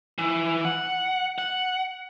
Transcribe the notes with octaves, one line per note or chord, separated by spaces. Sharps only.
E3
F#5
F#5